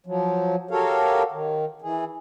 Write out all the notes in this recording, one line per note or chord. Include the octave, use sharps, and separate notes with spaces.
F3 F#3
F#4 G4 A4 A#4 C#5 F5
D#3
E3 G#4